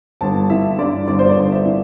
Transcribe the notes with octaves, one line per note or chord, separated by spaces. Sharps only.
G1 A5
E3 E5
G2 D5
G1 D5
C5
D5
G1
E5
E3